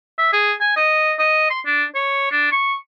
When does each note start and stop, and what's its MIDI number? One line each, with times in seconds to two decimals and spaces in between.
0.18 0.28 76
0.33 0.54 68
0.60 0.72 80
0.77 1.14 75
1.19 1.49 75
1.50 1.60 84
1.66 1.84 62
1.95 2.30 73
2.32 2.49 62
2.52 2.75 85